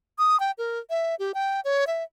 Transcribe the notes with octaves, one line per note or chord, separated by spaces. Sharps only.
D#6
G5
A#4
E5
G4
G5
C#5
E5